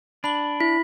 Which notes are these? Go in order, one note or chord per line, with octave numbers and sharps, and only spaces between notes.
D4 B5 F#7
E4 B6